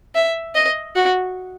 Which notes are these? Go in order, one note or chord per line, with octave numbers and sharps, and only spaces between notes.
E5
D#5
F#4